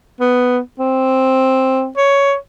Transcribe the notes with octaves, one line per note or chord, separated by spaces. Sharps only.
B3
C4
C#5